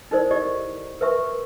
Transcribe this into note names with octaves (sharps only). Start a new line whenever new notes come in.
D#4 E4 A4 A#4 C5 D5
G4 D5 D#5 C#6
A#4 B4 E5 C6 C#6